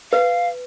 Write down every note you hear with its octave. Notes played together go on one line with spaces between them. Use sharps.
B4 F5